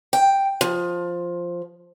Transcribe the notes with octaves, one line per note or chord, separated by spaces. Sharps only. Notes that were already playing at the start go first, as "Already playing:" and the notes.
G5
F3